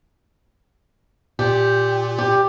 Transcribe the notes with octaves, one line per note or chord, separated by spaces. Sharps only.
A#2 G4
G4